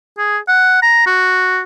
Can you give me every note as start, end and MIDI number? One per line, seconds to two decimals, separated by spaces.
0.18 0.38 68
0.48 0.80 78
0.82 1.06 82
1.07 1.61 66